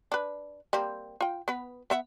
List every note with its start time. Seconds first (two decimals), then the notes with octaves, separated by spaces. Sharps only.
0.12 D4 B4
0.73 G3 A#3 C4
1.21 F4 G5
1.48 B3 B4
1.90 B3 E5 F#5